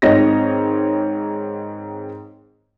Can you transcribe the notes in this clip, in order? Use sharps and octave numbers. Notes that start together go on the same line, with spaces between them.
G#2 D#3 C4 C#5 D#5 A#6